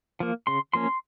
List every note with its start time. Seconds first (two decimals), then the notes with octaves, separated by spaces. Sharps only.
0.20 F3 A#3
0.47 C#3 C6
0.73 F3 A#3 C#4 C6